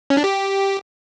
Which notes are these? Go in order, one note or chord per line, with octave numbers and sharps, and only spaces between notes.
C#4
D4
G4